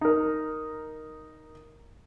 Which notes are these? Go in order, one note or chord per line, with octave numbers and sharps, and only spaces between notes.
D#4 A#4